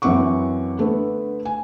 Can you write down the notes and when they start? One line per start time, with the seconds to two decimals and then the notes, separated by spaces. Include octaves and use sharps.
0.02 F#2 E3 C4 F#5 C#6 D6
0.79 D3 A3 B3 A4
1.45 G#5